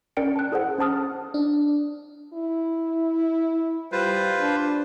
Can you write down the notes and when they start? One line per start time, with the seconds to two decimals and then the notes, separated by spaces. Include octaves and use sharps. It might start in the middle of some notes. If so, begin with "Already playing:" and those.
0.17 C#4 A#4 D5 G5 C#7 D7
0.36 A5 F#6
0.52 E4 G#4 A4 C5 F#5
0.78 C#4 C5 A5 D#6 F6
1.34 D4
2.33 E4
3.92 G3 F4 B4 C5
4.40 D4